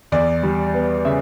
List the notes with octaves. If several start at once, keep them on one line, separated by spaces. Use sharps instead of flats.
E2 D5
G3
B3
C#3 E5